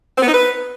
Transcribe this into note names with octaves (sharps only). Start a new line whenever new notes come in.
C4
B3
D#4
B4